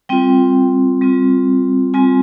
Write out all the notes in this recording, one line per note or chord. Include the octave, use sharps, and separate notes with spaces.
G3 C4 F4 G5
G3 C4 F4
G3 C4 F4 G#5